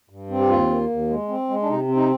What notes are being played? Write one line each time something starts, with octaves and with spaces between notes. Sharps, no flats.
G2
C4
G4
D#2 F4
A#3
D#2
G#3
C4
G#3
D4
C3 D#4
C4
D#4